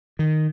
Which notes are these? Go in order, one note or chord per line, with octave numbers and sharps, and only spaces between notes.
D#3